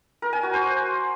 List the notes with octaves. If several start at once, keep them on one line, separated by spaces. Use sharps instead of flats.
A#4
G#5
F#4
C5